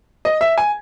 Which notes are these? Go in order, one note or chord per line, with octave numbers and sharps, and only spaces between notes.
D#5
E5
G#5